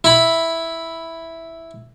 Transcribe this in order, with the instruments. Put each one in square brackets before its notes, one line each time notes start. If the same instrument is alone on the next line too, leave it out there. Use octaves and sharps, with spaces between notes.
[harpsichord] E4 B5